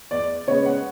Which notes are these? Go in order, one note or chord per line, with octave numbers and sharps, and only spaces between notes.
E2 D5
C#3 G#3 B3 C#5
F#5